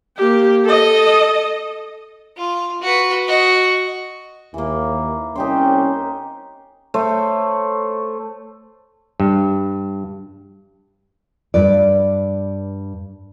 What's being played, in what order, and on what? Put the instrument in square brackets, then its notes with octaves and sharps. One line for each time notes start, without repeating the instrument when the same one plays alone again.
[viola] A#3 G4
A4 D#5
[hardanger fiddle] F4
F#4 B4
F#4 D#5
[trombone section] D#2 [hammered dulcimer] E3 A#3
[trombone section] C2 C#4 [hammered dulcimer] D#4 G4 C5
[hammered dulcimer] A3 C5 C#5
[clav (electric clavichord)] G2
[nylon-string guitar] G2 B4 D5